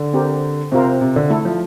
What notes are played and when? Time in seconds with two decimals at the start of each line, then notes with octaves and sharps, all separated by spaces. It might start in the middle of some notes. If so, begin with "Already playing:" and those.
Already playing: D3
0.13 C4 G4 A#4
0.72 C3 C4 F4 A#4
1.01 C3
1.16 D3
1.30 A3 E4 A4
1.45 F3